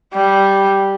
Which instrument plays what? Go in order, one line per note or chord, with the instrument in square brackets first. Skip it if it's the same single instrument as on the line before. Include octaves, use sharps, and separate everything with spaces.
[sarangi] G3